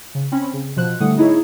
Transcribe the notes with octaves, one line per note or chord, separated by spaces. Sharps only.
C#3
C4 C#4 B5
C#3
B2 F3 C5 F#6
A2 D3 G3 A3 F#5 D#6
B3 D#4 E4 G#4 C#5